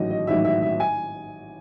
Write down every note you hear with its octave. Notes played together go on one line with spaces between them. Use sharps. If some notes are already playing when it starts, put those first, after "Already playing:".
Already playing: A1 G#2 D#3 F#3 D#5
D#5
A1 G#2 D#3 F#3 E5
E5
E5
G#5